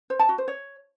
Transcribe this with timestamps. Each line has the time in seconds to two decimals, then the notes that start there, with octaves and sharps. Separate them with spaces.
0.10 C5
0.19 A5
0.29 F#4
0.38 C5
0.48 C#5